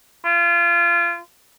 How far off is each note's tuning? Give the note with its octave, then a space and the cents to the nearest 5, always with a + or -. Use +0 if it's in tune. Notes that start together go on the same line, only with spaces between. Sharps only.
F4 -30